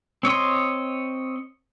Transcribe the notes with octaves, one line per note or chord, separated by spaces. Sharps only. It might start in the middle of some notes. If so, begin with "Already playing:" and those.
C4 C#5 D#5 C6